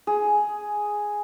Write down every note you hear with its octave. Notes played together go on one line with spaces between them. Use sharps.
G#4